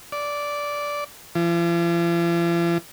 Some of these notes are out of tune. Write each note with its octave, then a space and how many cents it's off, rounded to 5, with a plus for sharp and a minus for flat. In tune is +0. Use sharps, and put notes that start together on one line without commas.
D5 -10
F3 -45